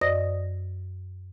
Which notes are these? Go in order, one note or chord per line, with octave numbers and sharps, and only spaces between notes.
F#2 C5 D5 D#5 D#6 A#6